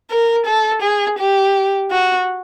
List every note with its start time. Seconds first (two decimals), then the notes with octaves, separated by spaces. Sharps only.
0.11 A#4
0.46 A4
0.82 G#4
1.19 G4
1.91 F#4